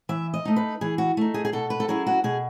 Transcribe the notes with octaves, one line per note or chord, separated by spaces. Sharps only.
E3 E5
D#5
A3 D#4
B4
E3 G#4
F#4
A3 D#4
G#4
G#4
B2 A4
B4
A4
F#3 C#4 E4 G#4
F#4
B2 G#4